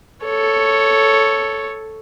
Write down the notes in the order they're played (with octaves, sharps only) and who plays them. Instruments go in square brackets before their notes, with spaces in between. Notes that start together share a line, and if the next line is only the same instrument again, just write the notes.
[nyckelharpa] A4 C#5